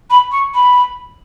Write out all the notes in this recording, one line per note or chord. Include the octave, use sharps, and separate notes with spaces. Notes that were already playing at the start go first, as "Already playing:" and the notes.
B5
C#6
B5